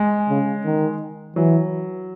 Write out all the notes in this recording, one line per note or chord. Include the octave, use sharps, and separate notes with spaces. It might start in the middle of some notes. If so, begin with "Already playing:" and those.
Already playing: G#3
C#3
D#3
E3 F#3